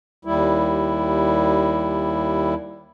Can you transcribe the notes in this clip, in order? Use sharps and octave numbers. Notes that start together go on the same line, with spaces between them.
D#2 G3 E4